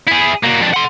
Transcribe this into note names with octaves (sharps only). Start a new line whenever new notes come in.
E4 G#4
A#3 F#4
F2 D4
F#5 C6